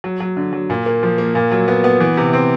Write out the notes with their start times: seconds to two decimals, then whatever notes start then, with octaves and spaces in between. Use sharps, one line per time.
0.04 F#3
0.20 F#3
0.37 D3
0.53 F#3
0.70 A#2
0.86 A#3
1.03 F3
1.18 A#3
1.35 A#2
1.52 F#3
1.68 B3
1.84 B3
2.00 E3
2.17 C3
2.33 C4